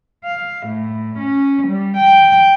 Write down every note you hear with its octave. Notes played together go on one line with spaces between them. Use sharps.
F5
A2
C#4
G3
G5